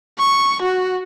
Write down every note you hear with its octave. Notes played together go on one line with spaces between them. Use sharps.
C#6
F#4